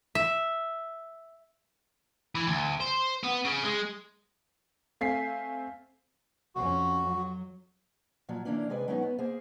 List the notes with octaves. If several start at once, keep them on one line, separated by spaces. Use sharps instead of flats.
E5
E3
D2
C5
B3
C#3
G#3
A3 C4 F5 G#5 B6 C7
F2 C#4 F#4
F#3
A#2 F3 F#3
D3 E3 A#3 C#4 D4
C3 G#3 G#4 B4 D5
F#3 G#3 B3 C#4 D#4
B3
A#3 G#4 C5